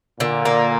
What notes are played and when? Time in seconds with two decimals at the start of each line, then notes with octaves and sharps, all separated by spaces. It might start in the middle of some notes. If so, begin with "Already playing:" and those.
0.20 A#2 D3
0.45 A#3